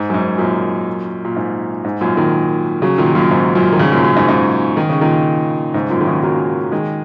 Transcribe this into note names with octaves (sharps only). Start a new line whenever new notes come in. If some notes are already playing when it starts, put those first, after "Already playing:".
Already playing: G#2
F#2
G#2
F#2 A#2
A#2
G#2
G#2
F#2 A#2
A#2 D#3
C#3 F#3
A#2 D#3
F#2 A#2
G#2
F#2 A#2
D#3
G#2 C#3
F#2 A#2
F#2
G#2
G#2 C#3
D#3
C#3
A#2 D#3
G#2 C#3
F#2 A#2
D#3
G#2 C#3
F#3 A#3
D#3 G#3